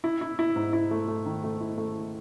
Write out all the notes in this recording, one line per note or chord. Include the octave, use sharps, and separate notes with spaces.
E4
E4
E4
G#2
E4
A3
A3
D#3
A3
E4
A3